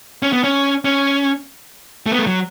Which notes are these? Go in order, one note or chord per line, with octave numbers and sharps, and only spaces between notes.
C#4
B3
C#4
C#4
A3
B3
A3
F#3